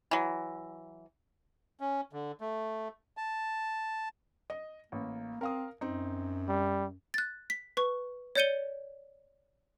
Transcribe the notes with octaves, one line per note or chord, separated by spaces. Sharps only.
E3 F#3
C#4
D3
A3
A5
D#5
A1 A#3
C4 A#4 F5 D#6
F#2 C4 D#4
G3
F#6 A6
B6
B4 C#6
C#5 D5 G6 C#7 D#7 G7